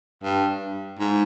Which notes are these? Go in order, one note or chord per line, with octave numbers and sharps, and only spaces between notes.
G2
G#2